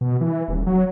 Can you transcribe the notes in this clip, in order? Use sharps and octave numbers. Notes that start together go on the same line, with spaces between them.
B2
E3
D#1
F#3